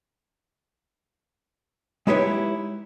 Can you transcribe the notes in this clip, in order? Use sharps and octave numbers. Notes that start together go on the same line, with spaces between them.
G#3 D#4 E4 G4 B4 C#5